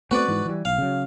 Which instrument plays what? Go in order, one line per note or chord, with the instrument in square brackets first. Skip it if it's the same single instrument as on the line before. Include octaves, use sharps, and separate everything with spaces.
[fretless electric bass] A3 B3 C4 [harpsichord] F#4 B4 D5
[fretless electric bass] G#2 E3
E3 G3
[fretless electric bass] B1 [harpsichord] F5
[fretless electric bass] C#3 F#3